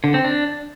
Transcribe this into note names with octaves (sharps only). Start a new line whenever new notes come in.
D3
C4
D4